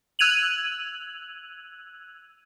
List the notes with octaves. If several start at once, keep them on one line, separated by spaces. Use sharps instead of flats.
E6 F#6 G#6 D#7 F7 F#7